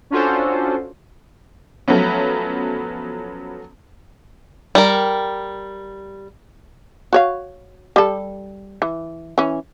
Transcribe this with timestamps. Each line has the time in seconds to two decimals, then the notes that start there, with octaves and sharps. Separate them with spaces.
0.10 C#4 D4 F4 F#4 A4 C5
1.88 F3 F#3 A3 B3 C#4
4.75 G3 A#4
7.13 F#4 C#5 F5
7.96 G3 A4
8.82 E3
9.38 E3 C#4